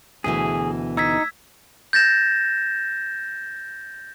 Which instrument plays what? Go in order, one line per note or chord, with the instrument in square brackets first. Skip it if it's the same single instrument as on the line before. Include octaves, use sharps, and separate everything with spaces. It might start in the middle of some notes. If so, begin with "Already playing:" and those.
[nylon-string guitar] D2 B2 E3 [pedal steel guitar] G#4
[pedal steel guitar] D#4 [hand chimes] E6 G#6 B6
[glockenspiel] G6 A6 A#6 E7